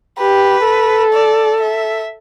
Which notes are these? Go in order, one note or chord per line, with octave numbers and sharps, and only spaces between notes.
G4 B4
A4
D5
E5